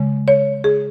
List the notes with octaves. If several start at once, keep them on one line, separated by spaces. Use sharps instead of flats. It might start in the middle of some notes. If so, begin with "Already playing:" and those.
Already playing: C#3 G#3
C#5
G#4